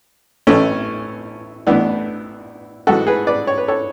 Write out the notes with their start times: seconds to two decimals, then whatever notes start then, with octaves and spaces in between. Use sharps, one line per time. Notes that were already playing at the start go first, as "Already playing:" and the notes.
0.47 A1 A2 E3 A3 C#4
1.67 A1 A2 E3 B3 D4
2.87 A1 G#2 E3 F#4 A4
3.07 G#4 B4
3.27 B4 D5
3.47 C#5
3.58 B4
3.68 A4 C#5